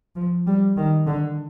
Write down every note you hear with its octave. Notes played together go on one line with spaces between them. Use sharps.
F3
G3
D#3
D3